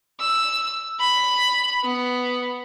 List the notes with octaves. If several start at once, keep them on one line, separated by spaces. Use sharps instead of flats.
E6
B5
B3